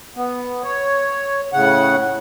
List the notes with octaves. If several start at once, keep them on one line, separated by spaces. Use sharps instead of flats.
B3
C#5
A2 C#3 F#5